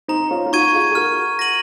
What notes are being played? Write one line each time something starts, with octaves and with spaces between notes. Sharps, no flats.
C4 D#4 A#5
C#4 F4
F4
D#4 F#4 C#6 G#6 D#7
F4 G#4
G#4
F#4 A#4 F6
A#6 D#7 F#7